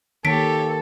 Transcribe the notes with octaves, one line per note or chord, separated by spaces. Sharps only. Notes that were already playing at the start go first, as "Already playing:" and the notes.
D#3 A#3 G4 A4 C#5 B6 D7